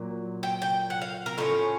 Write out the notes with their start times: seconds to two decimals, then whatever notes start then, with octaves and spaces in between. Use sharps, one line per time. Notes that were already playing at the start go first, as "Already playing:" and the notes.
Already playing: A#2 F#3
0.43 G5
0.62 G5
0.90 F#5
1.02 F5
1.26 A#4
1.38 A2 F3 A3 C#4 F4